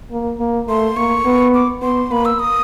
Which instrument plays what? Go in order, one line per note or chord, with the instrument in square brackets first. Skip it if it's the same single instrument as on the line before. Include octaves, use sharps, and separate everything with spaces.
[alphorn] A#3
A#3
[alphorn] A3 [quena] C6
[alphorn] A#3 [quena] C#6
[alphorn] B3
[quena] D6
[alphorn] B3 [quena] C6
[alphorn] A#3 [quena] B5
[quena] E6
D#6